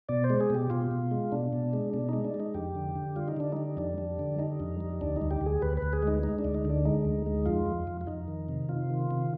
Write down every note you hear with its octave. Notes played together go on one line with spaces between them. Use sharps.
B2 D5
C5
G#3
G#4
B2 G4
B2 F4
B2
G#3
B2 D4
B2
G#3
B2 D4
G#3 D#4
D4
G#3
D#4
F2 G4
D3
D3
G3 F4
D#4
D3 D4
G3 D#4
F2 D4
G3
D3
G3 D#4
F2
G3
D2 D4
D#4
D2
G4
D2
G#4
D2 B4
B4
D2
G#4
G#3
D#4
G#3 D#4
D4
D2
D#4
D3 D4
G#3 D#4
D2
G#3
F2 F4
F2
F2
F4
F2 D#4
D#3
C3
C3 F4
D#3
C3